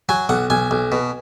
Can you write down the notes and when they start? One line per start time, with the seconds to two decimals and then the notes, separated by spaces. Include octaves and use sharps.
0.09 F#3 G#5
0.29 B1 F#5
0.50 B1 G#5
0.71 B1
0.92 B2